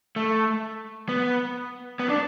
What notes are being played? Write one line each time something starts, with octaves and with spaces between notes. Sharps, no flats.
A3
B3
B3
D4